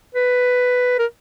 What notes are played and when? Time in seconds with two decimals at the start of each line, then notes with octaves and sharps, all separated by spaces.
0.15 B4
0.99 A#4